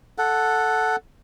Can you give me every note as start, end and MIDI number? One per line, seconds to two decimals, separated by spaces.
0.18 0.96 69
0.18 0.96 78